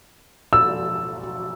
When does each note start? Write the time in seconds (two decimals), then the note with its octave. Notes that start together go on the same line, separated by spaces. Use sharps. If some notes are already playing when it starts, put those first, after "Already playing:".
0.53 E6